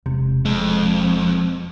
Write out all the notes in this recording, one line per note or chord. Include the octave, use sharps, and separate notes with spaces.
E1 C3
F2 G#3